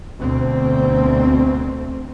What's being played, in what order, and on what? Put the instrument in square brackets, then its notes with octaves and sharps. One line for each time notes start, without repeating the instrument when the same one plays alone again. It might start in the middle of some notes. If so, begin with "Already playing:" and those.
[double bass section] D2 B2 C4